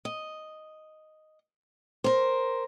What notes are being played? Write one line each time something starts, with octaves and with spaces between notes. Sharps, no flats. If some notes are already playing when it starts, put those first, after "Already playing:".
D#5
A#4 C5